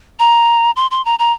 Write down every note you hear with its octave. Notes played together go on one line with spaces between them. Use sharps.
A#5
C6
C6
A#5
A#5